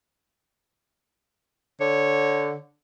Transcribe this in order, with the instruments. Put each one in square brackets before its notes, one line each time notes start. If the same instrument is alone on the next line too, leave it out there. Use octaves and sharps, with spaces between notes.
[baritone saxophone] D3 [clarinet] C#5